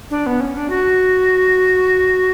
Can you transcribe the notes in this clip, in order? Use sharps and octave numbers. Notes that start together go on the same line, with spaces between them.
D4
B3
C#4
D4
F#4